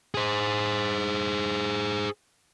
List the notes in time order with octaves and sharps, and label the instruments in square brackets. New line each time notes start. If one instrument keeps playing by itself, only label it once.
[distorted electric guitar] G#4 C5